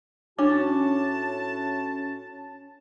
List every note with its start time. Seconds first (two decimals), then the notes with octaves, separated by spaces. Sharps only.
0.39 A2 C#4 D4 F#4 A5 D6